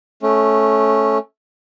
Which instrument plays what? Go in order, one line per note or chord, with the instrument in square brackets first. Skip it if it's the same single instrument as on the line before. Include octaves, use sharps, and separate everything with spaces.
[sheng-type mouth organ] A3 C#4